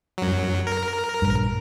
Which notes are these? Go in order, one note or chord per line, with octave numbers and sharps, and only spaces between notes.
F#2 F#3
A#4
A#1 G2